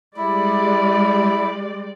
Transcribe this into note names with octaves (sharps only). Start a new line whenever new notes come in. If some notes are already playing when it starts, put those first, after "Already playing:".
G3 G#3 E4 D5